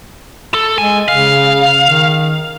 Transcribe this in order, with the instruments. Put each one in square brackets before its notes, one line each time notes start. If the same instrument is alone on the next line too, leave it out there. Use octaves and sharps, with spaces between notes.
[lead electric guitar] A4
[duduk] G#3 [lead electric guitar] G#5
[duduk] C#3 [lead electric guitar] F5
[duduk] D#3